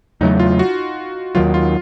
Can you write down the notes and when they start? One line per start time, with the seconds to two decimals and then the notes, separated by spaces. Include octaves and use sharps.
0.21 E2 C#3 F#3 A3 D#4
0.39 F4
0.59 F#4
1.35 D#2 D#3 F#3 F4
1.54 F4